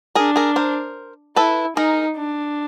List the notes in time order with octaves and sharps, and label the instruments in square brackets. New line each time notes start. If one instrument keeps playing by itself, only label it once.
[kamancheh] D4 [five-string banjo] G#4 A#4
[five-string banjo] G#4 A#4
A#4 C5
[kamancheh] E4 [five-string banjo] A4 B4
[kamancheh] D#4 [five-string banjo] G#4 A#4
[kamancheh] D4